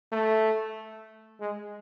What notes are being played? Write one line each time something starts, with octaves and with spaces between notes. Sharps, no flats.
A3
G#3